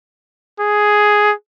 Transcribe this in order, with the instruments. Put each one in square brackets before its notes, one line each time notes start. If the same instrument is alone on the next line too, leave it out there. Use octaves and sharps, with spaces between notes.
[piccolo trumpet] G#4